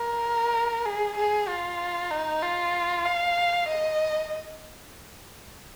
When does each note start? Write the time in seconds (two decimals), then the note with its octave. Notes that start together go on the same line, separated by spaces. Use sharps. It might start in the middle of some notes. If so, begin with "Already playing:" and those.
Already playing: A#4
0.86 G#4
1.17 G#4
1.48 F4
2.11 D#4
2.43 F4
3.05 F5
3.68 D#5